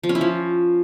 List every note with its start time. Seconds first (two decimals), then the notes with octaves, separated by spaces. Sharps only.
0.03 F3
0.09 C#4
0.15 E4
0.21 F3